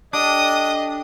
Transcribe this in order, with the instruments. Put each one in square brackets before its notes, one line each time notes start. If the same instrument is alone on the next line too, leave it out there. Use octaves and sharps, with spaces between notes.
[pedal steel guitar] D4 [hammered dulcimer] G4 A4 [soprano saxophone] D#5 [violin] D#6